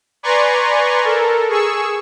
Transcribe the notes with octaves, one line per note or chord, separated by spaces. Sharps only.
B4 D5 G#5 A#5 C6 C#6
A4 A#4
G#4 C#6 E6